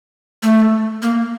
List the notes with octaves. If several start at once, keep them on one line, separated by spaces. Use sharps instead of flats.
A3
A#3